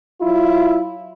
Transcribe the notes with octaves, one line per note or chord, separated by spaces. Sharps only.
F#3 E4 F4